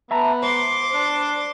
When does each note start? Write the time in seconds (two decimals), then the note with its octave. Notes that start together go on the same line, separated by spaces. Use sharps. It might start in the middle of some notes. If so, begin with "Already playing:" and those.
0.11 B3 E5 A5 A#5
0.43 C5 C6 D6
0.94 D4